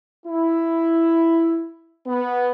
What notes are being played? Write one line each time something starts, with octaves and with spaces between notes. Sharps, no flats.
E4
B3